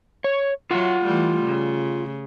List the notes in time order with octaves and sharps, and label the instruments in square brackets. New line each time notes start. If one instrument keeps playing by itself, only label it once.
[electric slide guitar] C#5
[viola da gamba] F#3 [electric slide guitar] F4 F#5
[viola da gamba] E3 G3 A3
C#3